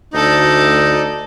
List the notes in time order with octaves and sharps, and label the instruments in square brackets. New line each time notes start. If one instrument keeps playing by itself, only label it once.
[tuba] D2 [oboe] D#4 [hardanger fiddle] A4 D5